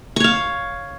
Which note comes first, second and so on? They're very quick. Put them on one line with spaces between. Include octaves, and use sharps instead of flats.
C#6 C#5 F5